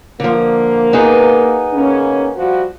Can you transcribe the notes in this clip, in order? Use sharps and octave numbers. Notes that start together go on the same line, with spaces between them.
D3 F3 A#3
B3 D#4 G#4
C#3 A#3 C#4
F3 G3 F#4